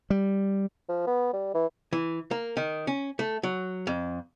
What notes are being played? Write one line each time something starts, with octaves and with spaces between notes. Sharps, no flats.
G3
F3
B3
G3
E3
E3
A#3
D#3
C#4
A3
F#3
F2